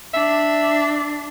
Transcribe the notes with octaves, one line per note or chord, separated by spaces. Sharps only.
D4 E5